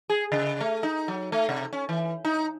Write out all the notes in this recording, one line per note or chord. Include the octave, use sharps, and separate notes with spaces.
G#4
C#3
A3
D#4
F#3
A3
C3
C#4
E3
D#4